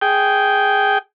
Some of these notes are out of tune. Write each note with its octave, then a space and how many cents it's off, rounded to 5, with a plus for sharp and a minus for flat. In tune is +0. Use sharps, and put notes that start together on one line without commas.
G#4 +0 G5 -10